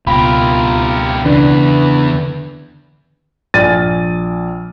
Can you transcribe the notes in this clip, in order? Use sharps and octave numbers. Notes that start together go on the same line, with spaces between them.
C#2 B2 F4 G4 A#4 B5
E2 C#3 D4 B4
A#1 D5 G#5 F6 A6 D#7